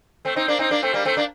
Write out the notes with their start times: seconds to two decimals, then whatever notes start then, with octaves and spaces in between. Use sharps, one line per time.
0.25 A3 C4
0.36 C4 D#4
0.48 A#3 D4
0.59 C4 D#4
0.71 A#3 D4
0.82 A3 C4
0.94 G3 A#3
1.05 A3 C4
1.17 A#3 D4